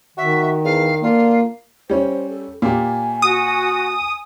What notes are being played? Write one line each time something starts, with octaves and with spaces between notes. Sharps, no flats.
D#3 F#4 E5
E2 F5
D3 A#3 F4
G3 C#4 C5
A4
A#2 G4 G#5
F#4 D#6